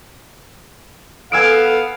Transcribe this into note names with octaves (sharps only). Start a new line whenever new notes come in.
B3 A4 F5 G#5 E6 D7